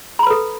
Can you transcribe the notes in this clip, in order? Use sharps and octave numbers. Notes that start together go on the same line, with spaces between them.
A4 B4 A#5 B5